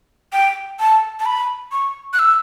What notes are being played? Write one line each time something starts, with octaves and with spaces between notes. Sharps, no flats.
G5
A5
A5
B5
C#6
F#6
E6